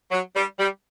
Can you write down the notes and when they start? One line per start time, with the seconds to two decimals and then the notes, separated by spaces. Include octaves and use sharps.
0.12 F#3
0.35 G3
0.59 G3